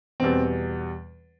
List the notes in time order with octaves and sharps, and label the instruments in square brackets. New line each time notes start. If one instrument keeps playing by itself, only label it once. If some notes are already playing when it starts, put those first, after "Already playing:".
[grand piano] E2 B2 G3 C4